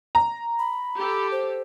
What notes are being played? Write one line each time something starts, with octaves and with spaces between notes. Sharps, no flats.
A#5
B5
G4 A4
C5